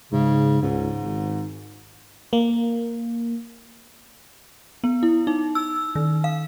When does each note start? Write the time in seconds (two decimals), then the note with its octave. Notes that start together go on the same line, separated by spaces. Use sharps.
0.12 G#2 C#3
0.62 C#2 G#2
1.02 G#1
2.33 A#3
4.84 B3
5.03 E4
5.27 D#4
5.55 E6
5.95 D#3
6.24 F5